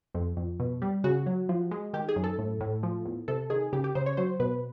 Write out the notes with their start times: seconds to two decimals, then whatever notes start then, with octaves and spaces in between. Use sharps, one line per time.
0.15 F2
0.37 F2
0.60 B2
0.82 G3
1.04 C#3 F#4
1.26 F#3
1.49 F3
1.71 G#3
1.93 D#3 G4
2.09 G#4
2.16 F#2
2.24 A4
2.39 A2
2.61 A2
2.83 F3
3.05 E2
3.28 C3 A4
3.50 D#3 G#4
3.73 C#3 G4
3.84 G4
3.95 C#3 C5
4.06 C#5
4.17 F#3 C5
4.40 B2 B4